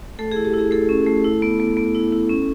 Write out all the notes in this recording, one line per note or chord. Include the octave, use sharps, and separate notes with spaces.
A3 A4
E4 G#4
G4
E4 G#4
A3 A4
C#4
A3
E4
B3
B3
B3
E4
E4
C#4